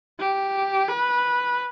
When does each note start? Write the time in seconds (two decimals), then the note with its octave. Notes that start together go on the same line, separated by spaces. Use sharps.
0.19 G4
0.88 B4